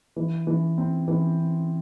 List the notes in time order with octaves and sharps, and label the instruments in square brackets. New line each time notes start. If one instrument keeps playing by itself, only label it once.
[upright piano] E3
E3
C4
E3